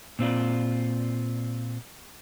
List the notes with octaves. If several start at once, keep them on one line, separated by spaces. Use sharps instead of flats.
A#2 C4 F4 D5